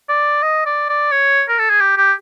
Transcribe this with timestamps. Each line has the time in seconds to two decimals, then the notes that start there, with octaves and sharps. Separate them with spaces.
0.09 D5
0.43 D#5
0.66 D5
0.89 D5
1.12 C#5
1.49 A#4
1.59 A4
1.70 G#4
1.80 G4
1.98 G4